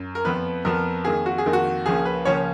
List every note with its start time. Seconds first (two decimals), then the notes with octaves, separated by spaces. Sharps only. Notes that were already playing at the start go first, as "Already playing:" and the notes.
Already playing: F#2
0.15 A#4
0.25 F2 F3 B3 B4
0.65 F2 F3 B3 A#4
1.04 F2 D#3 A#3 G#4
1.26 F#4
1.38 G#4
1.46 F2 D#3 A#3
1.53 F#4
1.86 C#2 C#3 F3 A#3 C#4 G#4
2.05 B4
2.25 C#2 C#3 F3 A#3 C#4 C#5